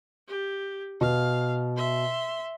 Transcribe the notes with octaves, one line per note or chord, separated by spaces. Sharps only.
G4
B2 F5
E5 C6